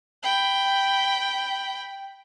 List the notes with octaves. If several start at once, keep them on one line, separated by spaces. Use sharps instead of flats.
G5 B5